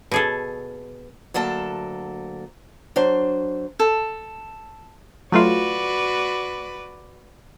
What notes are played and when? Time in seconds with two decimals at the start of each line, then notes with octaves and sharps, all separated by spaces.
0.11 B2 G#4 A4
1.34 D2 F#3 A#3 A4 A5
2.96 F#3 D4 C5
3.80 A4
5.32 F#3 A3 F4 F#4 B4 D5